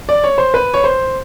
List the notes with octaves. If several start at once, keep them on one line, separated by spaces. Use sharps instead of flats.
D5
C#5
C5
B4
C#5
C5